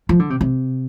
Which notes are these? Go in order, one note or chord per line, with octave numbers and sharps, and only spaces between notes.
F3
D3
C3
C3